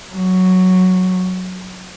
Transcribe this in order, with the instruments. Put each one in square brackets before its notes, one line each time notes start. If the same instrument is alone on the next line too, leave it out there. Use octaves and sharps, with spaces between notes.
[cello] F#3